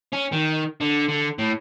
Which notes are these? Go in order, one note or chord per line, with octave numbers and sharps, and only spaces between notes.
C#4
D#3
D3
D3
A2